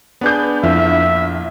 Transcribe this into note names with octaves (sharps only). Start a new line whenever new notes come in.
B3 D4 G#4 B4 D5 G6
A#1 F2 E4 E5 F6